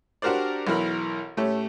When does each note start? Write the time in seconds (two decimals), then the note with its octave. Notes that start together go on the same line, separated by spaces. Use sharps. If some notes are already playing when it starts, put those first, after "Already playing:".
0.22 D4 F#4 G4 A#4 C5 D5
0.67 B1 E3 A#4 B5
1.37 A2 A3 C#4 G4